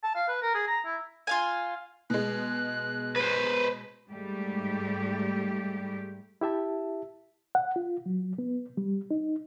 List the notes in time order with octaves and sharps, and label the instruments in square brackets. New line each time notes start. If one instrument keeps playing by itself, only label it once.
[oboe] A5
F5
B4
A#4
G#4
A#5
E4
[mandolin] F4 F5 G#5
[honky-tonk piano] B2 G#3 [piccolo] F#6
[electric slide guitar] B4 C5
[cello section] G#2 G3 A3 G4
[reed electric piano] E4 G4 E5 A5
F#5
F4
F#3
B3
G3
D#4